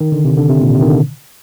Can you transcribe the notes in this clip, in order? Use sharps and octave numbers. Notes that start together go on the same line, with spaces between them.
D#3
D3
C3
D3
C3
A#2
C3
D#3
D3